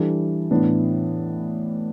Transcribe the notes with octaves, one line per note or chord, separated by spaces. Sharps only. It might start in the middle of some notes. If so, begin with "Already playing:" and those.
Already playing: E3 G3 D4 A4
A2 E3 B3 D4